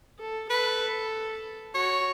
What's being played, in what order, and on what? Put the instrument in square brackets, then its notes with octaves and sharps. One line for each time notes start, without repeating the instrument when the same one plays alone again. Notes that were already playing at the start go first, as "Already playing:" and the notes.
[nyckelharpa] A4
[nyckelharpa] A4 [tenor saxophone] B4
[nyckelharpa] F#4 [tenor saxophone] C#5